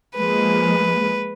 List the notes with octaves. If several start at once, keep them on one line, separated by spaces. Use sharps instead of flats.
F3 G#3 A#3 B4